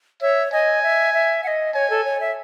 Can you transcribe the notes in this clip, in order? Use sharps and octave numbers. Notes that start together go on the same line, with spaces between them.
C#5 E5
D#5 G#5
E5
E5
F#5
D#5
C#5 G#5
A4
C#5
E5